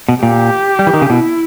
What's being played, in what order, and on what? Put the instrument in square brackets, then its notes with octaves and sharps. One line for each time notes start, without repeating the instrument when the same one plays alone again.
[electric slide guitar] B2
[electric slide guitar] A#2 [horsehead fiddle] G4
[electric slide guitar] G3
E3
D#3
C#3
[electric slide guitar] B2 [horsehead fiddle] E4